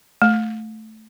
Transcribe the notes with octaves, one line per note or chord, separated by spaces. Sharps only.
A3